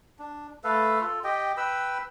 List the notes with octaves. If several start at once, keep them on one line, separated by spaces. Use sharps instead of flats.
D4
A3 A4 B4 F5
F4 A4
G4 D#5 G5
B4 G5 B5 E6